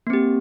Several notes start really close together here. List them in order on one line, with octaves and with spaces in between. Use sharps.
A#3 C4 G4